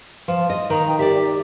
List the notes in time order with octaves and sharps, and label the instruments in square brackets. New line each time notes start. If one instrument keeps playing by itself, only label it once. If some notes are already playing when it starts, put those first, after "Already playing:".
[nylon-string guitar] F3
D#5
[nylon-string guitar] D#3 [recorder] A#5
[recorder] G5
[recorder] G4 [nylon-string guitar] D5 E5